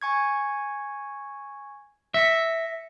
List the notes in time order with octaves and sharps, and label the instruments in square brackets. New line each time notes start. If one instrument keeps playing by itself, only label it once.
[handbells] G#5 C#6 G#6
[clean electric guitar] E5 [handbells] A#6 B6 C#7